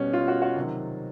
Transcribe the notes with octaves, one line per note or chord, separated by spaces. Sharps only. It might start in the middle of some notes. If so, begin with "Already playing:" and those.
Already playing: B2 G3 C#4
F4
F#4
F#4
C3 D#3 F#3